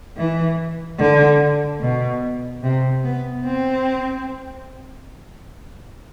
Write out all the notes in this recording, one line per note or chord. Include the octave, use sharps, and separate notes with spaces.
E3
D3
B2
C3
B3
C4